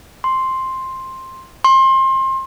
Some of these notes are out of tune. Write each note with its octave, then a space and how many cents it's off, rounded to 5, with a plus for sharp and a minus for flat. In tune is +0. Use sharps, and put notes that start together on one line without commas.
C6 +5
C6 +30